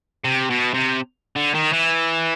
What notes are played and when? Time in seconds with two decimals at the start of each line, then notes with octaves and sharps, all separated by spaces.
0.24 C3
0.50 B2
0.74 C3
1.36 D3
1.54 D#3
1.72 E3